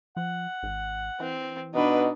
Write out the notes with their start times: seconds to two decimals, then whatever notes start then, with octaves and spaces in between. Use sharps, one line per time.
0.17 F3 F#5
0.63 G#1
1.20 E3 C4
1.74 B2 D4 D#4 B4